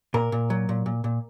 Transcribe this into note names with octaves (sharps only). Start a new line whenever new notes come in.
A#2 A#4
A#2
F#3
A#2
A#2
A#2